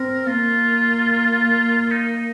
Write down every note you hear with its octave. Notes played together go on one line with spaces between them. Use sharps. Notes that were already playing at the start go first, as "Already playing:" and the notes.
Already playing: C4 A#4
A#3 F4
D#4